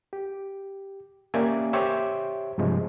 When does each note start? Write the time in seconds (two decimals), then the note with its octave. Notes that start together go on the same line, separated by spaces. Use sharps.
0.13 G4
1.34 A#3 C#4 G4 D5 E5 G#5
1.73 G4 C5 C#5 E5
2.58 G2 C3 F3 G#3